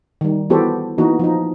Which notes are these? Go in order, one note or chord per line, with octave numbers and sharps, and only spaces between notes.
D#3 G3
E3 B3 F#4 G4 A4 C5
E3 A#3 B3 D#4 F#4
F3 D#4